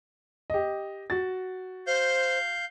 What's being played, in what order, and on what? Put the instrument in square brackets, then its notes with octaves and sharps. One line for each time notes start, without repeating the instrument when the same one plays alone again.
[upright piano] G4 D#5
F#4 A6
[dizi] C5 [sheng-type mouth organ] F5 G6